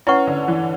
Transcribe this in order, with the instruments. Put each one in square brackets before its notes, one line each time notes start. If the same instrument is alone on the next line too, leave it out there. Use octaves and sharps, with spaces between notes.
[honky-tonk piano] C#4 [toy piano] E4 B4 F#5 C#6
[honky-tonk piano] D3
E3